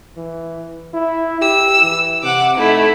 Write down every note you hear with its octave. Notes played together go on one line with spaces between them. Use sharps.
E3
E4
G4 E6
E3
C3 F#5 D6
A3 D#4 E4